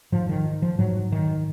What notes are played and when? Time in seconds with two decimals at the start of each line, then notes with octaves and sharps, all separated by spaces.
0.12 G#2 F3
0.29 D#3
0.62 F3
0.78 G#2 F#3
1.12 D#3